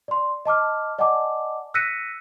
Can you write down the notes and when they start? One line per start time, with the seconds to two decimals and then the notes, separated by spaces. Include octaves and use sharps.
0.08 D5 C6
0.46 D#5 A5 D6 F6
0.98 D5 D#5 F#5 G#5 A5 D6
1.74 E6 F#6 A#6 B6 C#7 D#7